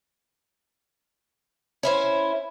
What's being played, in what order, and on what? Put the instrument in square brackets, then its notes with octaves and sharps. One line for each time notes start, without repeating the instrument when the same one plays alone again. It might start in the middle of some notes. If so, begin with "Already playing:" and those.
[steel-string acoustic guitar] C#4 E4 C5